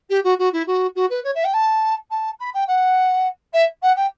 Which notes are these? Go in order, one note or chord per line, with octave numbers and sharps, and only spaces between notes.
G4
F#4
F#4
E4
F#4
F#4
B4
C#5
E5
G5
A5
A5
B5
G5
F#5
E5
F#5
G5